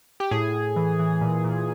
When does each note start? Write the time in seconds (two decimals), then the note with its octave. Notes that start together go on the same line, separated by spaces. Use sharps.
0.20 G4
0.31 A2 G#4
0.53 A2
0.76 E3
0.99 E3
1.21 A#2
1.44 A#2